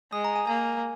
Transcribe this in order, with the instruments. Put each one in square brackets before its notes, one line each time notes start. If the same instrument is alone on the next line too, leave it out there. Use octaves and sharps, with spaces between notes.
[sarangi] G#3 [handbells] D#6
[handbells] A#5
G#5
[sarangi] A#3 [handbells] G#5